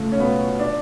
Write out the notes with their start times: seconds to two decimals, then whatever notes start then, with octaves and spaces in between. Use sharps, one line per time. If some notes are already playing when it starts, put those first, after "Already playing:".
Already playing: C#2 A3
0.12 C#4
0.19 B2 F#3 B3
0.59 D4